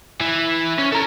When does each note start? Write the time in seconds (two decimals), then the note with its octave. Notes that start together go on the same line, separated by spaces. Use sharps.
0.21 E3
0.79 C#4
0.92 A4 A#5